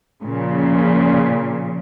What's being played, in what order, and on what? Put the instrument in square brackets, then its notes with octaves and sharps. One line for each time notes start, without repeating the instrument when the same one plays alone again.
[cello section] A#2 C#3 F3